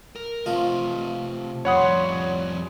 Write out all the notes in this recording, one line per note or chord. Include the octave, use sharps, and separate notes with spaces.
A#4
C3 F3 A3 F4 D#5
F2 G3 C#5 F#5 B5 C6 D#6